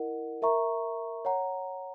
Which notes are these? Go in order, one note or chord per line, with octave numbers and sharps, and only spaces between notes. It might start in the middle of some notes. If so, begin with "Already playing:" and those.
Already playing: E4 A#4 D#5 F#5
A#4 E5 A#5 C#6
C#5 F#5 A#5